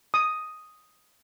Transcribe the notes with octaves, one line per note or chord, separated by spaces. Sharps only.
D#6